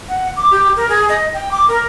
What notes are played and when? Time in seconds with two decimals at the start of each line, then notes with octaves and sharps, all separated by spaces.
0.09 F#5
0.36 D6
0.51 G4
0.76 A#4
0.90 G#4
1.09 D#5
1.34 G5
1.51 D6
1.68 A#4